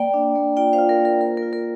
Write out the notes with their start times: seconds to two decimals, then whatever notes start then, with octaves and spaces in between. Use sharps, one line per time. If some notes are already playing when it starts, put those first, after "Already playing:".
Already playing: A#3 D5 G5
0.14 D4
0.35 A#3
0.57 F4 D5 G5
0.73 C5 F5
0.78 F4
0.89 A#4
0.99 A#3
1.05 A#4
1.21 F4 A#4
1.37 A#4
1.42 F4
1.53 A#4